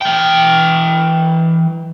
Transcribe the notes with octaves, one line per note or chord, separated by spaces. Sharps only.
E3 G5